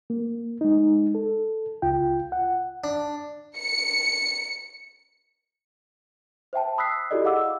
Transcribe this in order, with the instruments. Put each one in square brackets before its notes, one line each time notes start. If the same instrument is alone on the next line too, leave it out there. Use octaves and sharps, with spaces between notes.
[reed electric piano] A#3
G#3 D#4
A4
C#2 F4 G5
F#5
[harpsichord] D4
[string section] C#7
[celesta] C5 E5 G5 A5
B5 D#6 E6 F#6 B6 C7
E4 F#4 G4 A4 D5 D#5
G#4 D#5 F5 F#5 D6 E6